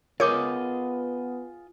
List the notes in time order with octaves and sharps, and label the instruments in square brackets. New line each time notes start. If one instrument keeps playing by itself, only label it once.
[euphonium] B3 [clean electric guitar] F4 G#4 D#5 [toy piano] A#4 D6 [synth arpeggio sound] C#5 G6